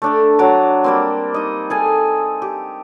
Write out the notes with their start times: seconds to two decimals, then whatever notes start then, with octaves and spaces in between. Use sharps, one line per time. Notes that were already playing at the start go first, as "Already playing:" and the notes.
0.02 A3 D4 A4
0.39 F#3 D4 D5 A#5
0.84 G3 A#3 C4
1.34 D#4 D#5
1.70 G#4 A4 G#5
2.42 G4